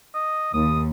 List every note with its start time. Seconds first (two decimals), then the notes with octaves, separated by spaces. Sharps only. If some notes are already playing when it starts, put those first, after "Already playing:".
0.15 D#5
0.53 D#2 D#6